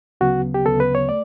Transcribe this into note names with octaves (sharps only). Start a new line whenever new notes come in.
D2 C#3 F#3 B3 F#4
G4
D2 C#3 F#3 B3 A4
B4
C#5
A3 D5